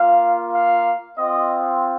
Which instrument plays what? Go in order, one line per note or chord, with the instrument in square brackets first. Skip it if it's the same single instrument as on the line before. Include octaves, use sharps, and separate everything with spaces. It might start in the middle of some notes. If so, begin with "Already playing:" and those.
Already playing: [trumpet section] A#3 F4 F5
F5
C4 F4 D#5